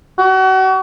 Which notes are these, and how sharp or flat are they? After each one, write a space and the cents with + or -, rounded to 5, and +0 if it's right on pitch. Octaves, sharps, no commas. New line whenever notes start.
F#4 +35